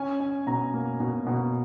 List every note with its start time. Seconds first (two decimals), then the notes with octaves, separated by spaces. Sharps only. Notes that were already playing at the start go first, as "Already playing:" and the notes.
Already playing: C#4 G#5
0.20 C#4
0.47 B2 A#5
0.74 A#3
1.00 B2
1.27 B2